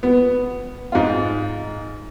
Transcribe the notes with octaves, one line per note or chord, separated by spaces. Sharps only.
B3
G#2 F4